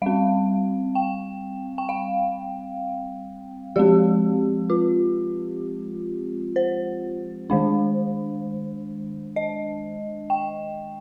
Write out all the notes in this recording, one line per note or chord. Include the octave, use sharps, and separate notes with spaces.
G3 C4 F5
G5
G5
F5
F3 G#3 C4 G4
F4
C5
D#3 G#3 D4
D#5
G5